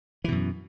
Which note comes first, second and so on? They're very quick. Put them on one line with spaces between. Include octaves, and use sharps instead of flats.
E3 B2 F#2